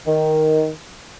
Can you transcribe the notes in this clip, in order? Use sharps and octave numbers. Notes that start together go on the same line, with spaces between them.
D#3